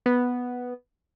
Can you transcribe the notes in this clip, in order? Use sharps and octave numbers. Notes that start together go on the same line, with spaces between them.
B3